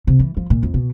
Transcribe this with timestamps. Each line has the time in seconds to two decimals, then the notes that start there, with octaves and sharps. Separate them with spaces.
0.07 C3
0.19 E3
0.37 F3
0.50 A#2
0.63 F2
0.74 B2